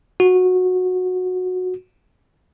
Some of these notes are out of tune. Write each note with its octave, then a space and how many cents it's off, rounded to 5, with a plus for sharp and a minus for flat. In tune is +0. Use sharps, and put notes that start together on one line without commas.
F#4 -15